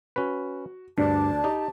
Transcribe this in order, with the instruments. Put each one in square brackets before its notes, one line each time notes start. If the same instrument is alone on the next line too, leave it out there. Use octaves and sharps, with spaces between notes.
[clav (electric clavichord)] C#4 B4 [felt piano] F#4
[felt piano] D2 [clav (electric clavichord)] G2 [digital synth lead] D4 [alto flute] A5
[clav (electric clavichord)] D#4 [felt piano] G4